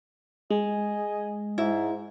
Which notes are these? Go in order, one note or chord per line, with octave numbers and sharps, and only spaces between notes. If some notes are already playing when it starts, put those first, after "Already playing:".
G#3 D#5 G#5
G#2 E4